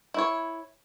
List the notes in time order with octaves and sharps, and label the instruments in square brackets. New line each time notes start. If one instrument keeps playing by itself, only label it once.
[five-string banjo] E4 C#5